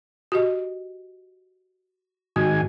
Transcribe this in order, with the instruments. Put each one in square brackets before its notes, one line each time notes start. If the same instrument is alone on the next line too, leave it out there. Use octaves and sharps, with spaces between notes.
[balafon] F#4 G4 D#5
[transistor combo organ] G#2 D#3 G#5 [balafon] F#4